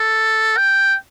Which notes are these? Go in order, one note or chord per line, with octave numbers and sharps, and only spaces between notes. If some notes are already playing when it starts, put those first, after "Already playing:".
Already playing: A4
G5